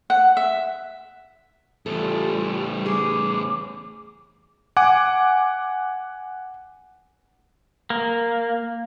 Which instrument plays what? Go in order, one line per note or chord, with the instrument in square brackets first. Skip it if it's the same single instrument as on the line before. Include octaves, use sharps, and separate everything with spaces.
[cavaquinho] F#5
E5
[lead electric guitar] E2 A2 [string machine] G3 [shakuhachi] F4 [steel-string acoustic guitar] A4
[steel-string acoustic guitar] G#4 [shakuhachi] D6
[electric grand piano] F#5 G#5 D6
[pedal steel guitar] A#3